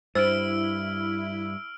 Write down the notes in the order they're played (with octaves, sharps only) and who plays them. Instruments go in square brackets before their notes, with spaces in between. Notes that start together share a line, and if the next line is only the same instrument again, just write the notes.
[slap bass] G2 [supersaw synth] E4 [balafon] C5 [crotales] E6 F6 D7